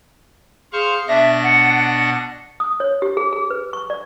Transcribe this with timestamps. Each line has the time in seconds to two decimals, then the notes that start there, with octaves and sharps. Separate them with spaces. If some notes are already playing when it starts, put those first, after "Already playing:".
0.73 G#4 C5 F5 C#6
1.08 B2 D4 E5 A#6
1.43 F#5
1.87 F#5
2.60 D#6
2.80 C#5
3.02 G4
3.17 G#4
3.33 G#4
3.50 B4
3.73 C#6
3.90 D5